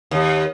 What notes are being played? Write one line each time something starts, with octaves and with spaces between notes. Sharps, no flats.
D#2